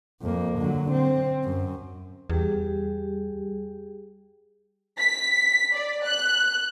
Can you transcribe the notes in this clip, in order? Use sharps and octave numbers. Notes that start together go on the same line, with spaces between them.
F2 A#3
D3 F#3
C4
F#2
E2 G3 G4 G#4
B6
D5
F#6